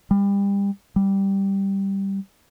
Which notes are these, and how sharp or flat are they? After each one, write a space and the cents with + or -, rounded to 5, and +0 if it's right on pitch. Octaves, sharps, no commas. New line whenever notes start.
G3 +30
G3 +0